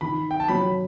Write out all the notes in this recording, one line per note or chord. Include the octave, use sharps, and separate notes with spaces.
D#3 B5
G5
A5
F#3 B5